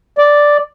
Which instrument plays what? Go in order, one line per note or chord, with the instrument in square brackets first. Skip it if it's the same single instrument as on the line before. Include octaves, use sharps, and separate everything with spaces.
[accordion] D5